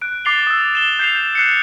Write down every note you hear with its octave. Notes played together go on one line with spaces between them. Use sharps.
F#6 D7
D6 A6 C7 F7 G7
D#6 E6
E7 G7
G6 C7 F7
F#6 C7 C#7